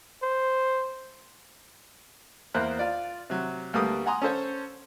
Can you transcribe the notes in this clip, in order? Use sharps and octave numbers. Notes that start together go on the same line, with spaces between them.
C5
E2 A#3 C5 F#6
F4 D5
C3 F#3
D2 G3 A#3 B3 A4 D#6
F#5 G#5 A#5 C6 D#6
C#4 A4 C5 C#5